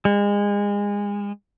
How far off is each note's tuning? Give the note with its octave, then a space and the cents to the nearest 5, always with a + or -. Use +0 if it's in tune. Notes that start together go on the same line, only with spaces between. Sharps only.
G#3 -30